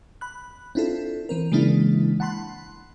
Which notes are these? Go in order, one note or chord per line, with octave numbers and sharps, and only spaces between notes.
B5 F#6
C4 D4 E4 F4 A4
E3 C4 A#4
C#3 E3 G#3 A#3 D4 E4
F#5 A5 B5 C6 F#6